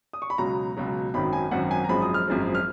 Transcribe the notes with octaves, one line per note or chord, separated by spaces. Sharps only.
D#6
C#6
B5
C#2 B2 F#3 A#5
C#2 B2 F#3
G#1 F#2 D#3 F#3 B5
G#5
G#1 F#2 D#3 F#3 F#5
G#5
A#5
G#1 F#2 F3 G#3 B5
D#6
F6
G#1 F#2 F3 G#3
F6